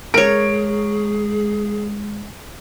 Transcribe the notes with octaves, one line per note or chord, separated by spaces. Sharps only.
G#3 G#4 A#4 C#5 D7